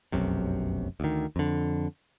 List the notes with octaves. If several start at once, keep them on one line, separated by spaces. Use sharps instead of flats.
F1 B1 F#2 C3
D2 D#3
F2 D3